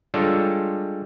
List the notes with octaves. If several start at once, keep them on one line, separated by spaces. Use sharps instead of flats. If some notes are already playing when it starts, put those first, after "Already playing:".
G3 G#3 D4 F4 A4 C#5